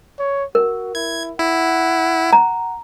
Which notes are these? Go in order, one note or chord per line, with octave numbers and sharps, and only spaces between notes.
C#5
F#4 A#4
E4 G#6
E4 F#5
A#5